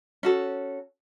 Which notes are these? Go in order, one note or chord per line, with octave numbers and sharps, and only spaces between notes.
C#4 F#4 A4